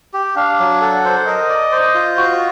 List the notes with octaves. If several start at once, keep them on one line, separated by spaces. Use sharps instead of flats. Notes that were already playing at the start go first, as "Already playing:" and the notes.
G4
D4 F5
F#3
A4 F#5
C5
A#4 D#5
D5
C5
F4
F#4